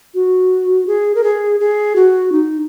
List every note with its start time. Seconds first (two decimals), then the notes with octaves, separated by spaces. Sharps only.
0.14 F#4
0.87 G#4
1.15 A#4
1.24 G#4
1.60 G#4
1.96 F#4
2.32 D#4